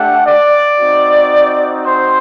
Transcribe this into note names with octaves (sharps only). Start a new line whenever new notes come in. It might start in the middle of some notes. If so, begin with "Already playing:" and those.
Already playing: A3 D4 G4 F#5
D5
C4 D#4 F#4
C5